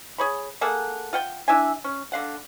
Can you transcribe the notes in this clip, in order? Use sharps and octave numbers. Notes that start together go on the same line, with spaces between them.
G#4 C#5 B5
A#3 G#4 A4 F#5
F4 F#5 G5
D4 E4 E5 G#5
C#4
D3 F5 F#5